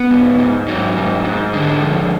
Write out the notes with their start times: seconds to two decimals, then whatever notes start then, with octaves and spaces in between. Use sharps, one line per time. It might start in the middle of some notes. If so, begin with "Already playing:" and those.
Already playing: B3
0.11 G#2
0.39 G#2
0.68 G#2 F#3
0.97 G#2
1.25 G#2
1.53 D3 G#3
1.82 F2